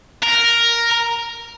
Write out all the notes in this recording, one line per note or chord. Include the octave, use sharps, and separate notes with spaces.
A#4